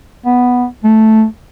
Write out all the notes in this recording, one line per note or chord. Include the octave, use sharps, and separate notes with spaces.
B3
A3